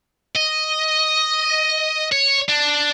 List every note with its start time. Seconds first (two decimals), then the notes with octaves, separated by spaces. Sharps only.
0.36 D#5
2.12 C#5
2.49 D4